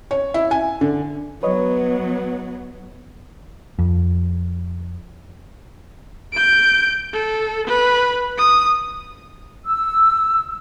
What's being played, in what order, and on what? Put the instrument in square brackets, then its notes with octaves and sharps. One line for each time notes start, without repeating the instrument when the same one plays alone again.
[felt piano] C#5
E4
G#5
D3
[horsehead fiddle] F#3 B3 [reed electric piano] B4 C#5 D#5
[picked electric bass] F2
[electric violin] G6 D7
A4
B4
D#6
[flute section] E6